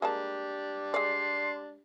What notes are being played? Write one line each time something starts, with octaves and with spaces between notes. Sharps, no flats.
G#3 A#3 D4 G4 A5
G#3 D5 C6